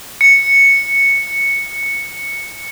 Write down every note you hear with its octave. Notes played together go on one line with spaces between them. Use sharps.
C#7